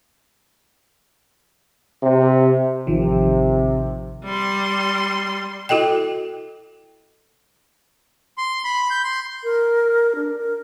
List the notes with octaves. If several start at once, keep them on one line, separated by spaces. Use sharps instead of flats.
C3
A1 C3 D#3 F3
G3 C6
E4 F#4 A4 D#5 G5
C6
B5
G6
C6
A#4
D4
A#4